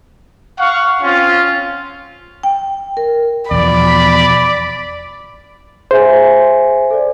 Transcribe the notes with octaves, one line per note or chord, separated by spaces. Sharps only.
F5 F#5 C#6
C4 C#4 F4
G5
A#4
E2 B2 F3 D5 B5
G#4 C5 E5 G#5
A4 D5